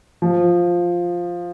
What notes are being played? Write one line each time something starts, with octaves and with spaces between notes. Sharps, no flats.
F3